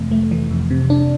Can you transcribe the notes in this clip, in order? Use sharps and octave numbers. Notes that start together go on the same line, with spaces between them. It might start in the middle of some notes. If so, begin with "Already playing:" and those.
Already playing: F2 C3 E3 A3
A3
E3
F2
C3
D4